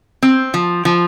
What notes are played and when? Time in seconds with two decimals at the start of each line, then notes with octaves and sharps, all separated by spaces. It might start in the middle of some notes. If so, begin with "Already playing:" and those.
0.23 C4
0.54 F3
0.85 F3